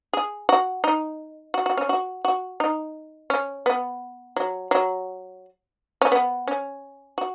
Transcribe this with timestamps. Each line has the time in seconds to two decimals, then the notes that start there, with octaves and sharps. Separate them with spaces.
0.13 G#4
0.49 F#4
0.84 D#4
1.54 F#4
1.66 F#4
1.77 C#4
1.89 F#4
2.25 F#4
2.60 D#4
3.30 C#4
3.66 B3
4.36 F#3
4.71 F#3
6.01 C#4
6.12 B3
6.47 C#4
7.18 F#4